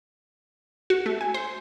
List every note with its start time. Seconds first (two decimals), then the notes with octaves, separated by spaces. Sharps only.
0.90 F#4
1.06 A3
1.21 G#5
1.34 C5